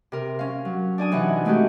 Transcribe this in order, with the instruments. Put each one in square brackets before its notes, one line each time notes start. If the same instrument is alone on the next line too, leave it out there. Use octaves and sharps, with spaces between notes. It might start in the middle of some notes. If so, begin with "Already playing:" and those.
[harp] C3 A#4
C#4 F5
F#3
D4 D5 G#5 D#6
C3 E3 D4 D#4 F#5
G#3 A3 C4 C#4 F#4 G4